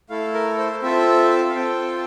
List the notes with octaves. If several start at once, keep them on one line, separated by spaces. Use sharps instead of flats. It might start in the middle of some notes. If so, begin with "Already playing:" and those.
A3 E4 A4 F5
A#4
C5
C4 F4 A4 E5
F5
C4 F4 A4 G5